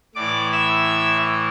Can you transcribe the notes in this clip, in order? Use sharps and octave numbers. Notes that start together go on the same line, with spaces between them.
A2 E3 D5 D6
E5 E6